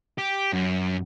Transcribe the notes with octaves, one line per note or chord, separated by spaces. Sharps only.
G4
F#2